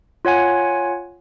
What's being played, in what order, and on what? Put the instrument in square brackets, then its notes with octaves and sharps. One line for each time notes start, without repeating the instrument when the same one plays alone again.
[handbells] F4 C#5 F#5 G#5